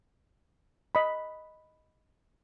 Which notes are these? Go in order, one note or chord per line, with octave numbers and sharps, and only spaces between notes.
D#5 B5